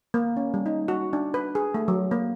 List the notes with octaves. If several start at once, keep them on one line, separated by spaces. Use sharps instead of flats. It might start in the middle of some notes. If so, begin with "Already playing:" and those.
A#3
C#4
G3
D#4
F#4
D4
B4
G#4
A3
F#3
A#3